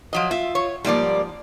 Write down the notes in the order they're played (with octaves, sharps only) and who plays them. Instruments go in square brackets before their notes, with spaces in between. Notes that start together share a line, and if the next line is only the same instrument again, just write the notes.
[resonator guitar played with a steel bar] F3 F#3 D#5
[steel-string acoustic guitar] F4 [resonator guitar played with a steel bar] E5
[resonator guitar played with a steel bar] C#5
[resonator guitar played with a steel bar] G#2 F3 [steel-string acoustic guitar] G3 A#3 D5